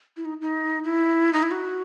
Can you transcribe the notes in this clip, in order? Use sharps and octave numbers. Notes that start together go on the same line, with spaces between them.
E4
D#4
D#4
E4
D#4
E4
F#4